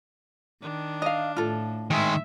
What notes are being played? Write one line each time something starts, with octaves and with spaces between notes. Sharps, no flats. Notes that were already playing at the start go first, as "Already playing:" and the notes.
D#3 D4
D#5 F5
A2 F4 A4
D#3 G#3 G#4 E5